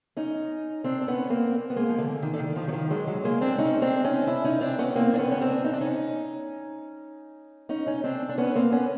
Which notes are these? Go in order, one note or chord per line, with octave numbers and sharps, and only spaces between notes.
C#4 D#4
C4 D4
D4
B3 C#4
A#3 C4
B3
G#3 A#3
F3
D3 E3
D#3
D3
D#3
D#3 F3
F#3
D#3 F3
F#3 G#3
F#3 G#3
G#3 A#3
C4 D4
C#4 D#4
C4 D4
C#4 D#4
D4 E4
C#4 D#4
C4 D4
B3 C#4
A#3 C4
D4
B3 C#4
C#4
C4 D4
D#4
D4
C#4 D#4
C#4 D#4
C#4 D#4
C4 D4
D4
B3 C#4
A#3 C4
B3 C#4